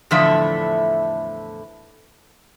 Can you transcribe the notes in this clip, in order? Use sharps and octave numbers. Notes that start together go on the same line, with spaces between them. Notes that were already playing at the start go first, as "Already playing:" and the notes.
E2 A2 D3 F3 A3 E5